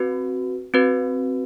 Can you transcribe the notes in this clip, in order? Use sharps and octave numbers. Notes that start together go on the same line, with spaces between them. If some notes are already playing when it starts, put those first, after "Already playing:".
Already playing: C4 F#4 B4
C4 F#4 B4